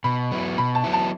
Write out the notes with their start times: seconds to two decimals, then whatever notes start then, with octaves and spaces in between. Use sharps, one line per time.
0.04 B2 B5
0.31 F#3 B3 E4
0.58 B2 B5
0.75 A5
0.84 F#3 B3 E4
0.93 A5